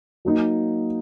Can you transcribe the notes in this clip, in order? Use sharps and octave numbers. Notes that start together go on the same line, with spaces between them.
F#3 A#3 D#4